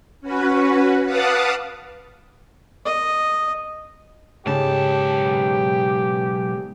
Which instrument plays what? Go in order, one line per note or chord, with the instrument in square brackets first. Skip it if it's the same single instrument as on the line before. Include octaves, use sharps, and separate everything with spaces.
[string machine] C#4 F#4 B4
B4 F5 F#5 A5 D6 D#6
[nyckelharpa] D#5
[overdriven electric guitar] B1 A5 [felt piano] G#2 C#3 G#3 [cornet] G4